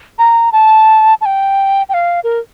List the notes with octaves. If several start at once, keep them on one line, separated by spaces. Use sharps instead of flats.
A#5
A5
A5
G5
G5
F5
A#4